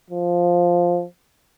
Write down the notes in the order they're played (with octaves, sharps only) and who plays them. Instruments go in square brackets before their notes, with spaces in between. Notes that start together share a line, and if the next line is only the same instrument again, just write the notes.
[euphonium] F3